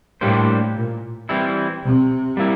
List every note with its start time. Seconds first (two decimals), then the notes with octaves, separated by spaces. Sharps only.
0.21 A2 G3 A#3 D4 G4 C5
0.75 A#2
1.29 E3 G3 C4 E4
1.84 C3
2.37 G3 A#3 E4